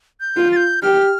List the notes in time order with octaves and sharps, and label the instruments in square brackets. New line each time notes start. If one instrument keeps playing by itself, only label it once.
[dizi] G6
[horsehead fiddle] F4
[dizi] A6
G6
[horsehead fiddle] G4 [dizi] F6